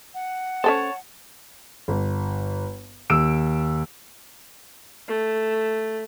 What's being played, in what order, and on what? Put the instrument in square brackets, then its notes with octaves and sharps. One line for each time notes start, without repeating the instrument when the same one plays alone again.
[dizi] F#5
[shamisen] C#4 A4 C5 [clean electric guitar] C#5 A5
[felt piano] G1
D#2 E6 D7
[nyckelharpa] A3